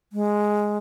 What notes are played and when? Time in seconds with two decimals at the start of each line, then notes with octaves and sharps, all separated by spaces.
0.13 G#3